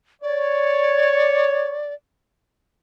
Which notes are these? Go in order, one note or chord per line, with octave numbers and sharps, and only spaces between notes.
C#5 D5